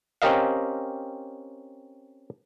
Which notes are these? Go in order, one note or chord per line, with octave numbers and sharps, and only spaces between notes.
C4 C#4 G4 A#4 D#5 F5